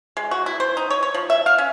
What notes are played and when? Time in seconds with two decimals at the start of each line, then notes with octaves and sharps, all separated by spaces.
0.17 G#3
0.31 F#4
0.46 E4
0.60 C5
0.77 D#4
0.90 C#5
1.03 C#5
1.14 F3
1.30 E5
1.46 F5
1.58 C#4